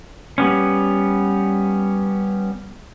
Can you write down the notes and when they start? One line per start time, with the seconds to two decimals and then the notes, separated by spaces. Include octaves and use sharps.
0.38 G3 B3 C#4